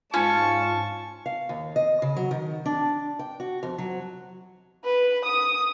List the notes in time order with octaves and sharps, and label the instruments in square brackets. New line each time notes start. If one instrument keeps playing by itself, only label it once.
[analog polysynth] G#2 F4 [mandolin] C#4 [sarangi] A5 [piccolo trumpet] C#6
[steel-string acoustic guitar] F5
D#2
D#5
C#3
F#3
D#3
D4
G5
F#4
F2
F#3
[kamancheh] B4
D#6